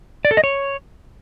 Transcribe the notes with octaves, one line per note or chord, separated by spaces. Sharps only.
D5
A4
D#5
C#5